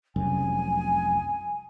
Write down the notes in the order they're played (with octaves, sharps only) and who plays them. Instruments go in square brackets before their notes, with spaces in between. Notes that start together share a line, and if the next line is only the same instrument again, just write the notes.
[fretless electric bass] F1 C2 F#2 [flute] G#5